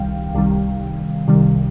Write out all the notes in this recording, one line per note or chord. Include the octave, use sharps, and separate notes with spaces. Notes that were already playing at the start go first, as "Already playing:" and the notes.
Already playing: C2 C3 D#3 G3 F5 G5
C2 C3 D#3 G3
C2 C3 D#3 G3